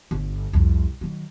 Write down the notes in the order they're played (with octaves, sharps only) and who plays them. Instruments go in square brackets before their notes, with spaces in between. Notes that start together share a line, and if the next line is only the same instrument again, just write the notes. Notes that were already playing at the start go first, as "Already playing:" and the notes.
[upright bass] G1
C2 F2
D#3 F#3